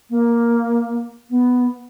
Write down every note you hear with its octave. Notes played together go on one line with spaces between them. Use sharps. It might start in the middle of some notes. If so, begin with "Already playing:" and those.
A#3
B3